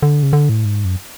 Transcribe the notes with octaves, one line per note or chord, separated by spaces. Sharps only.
D3
C#3
D3
A2
G#2
F#2